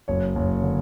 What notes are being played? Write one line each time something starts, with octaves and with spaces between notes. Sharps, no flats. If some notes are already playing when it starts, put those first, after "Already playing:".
F#1 C#5
F#1
D3